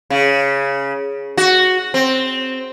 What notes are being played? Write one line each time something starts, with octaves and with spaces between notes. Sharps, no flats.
C#3
F#4
C4